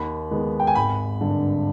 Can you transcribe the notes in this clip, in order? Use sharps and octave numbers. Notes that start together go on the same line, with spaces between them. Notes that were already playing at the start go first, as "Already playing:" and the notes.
Already playing: D#2 B5
D#3 G#3 B3
G5
G#5
G#1 B5
G2 D3